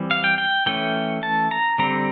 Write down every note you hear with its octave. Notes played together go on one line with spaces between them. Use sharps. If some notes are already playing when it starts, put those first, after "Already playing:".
Already playing: E3 G3 C4
F5
G5
G5
E3 A3 C#4 G5
A5
A#5
D3 G3 C4 A#5